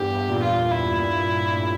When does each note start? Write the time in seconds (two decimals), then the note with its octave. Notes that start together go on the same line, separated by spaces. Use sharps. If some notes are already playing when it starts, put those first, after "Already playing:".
Already playing: E2 G2 G4
0.14 E2 G2
0.28 G2 A#2
0.42 F4
0.71 E4
1.43 A#2
1.55 A2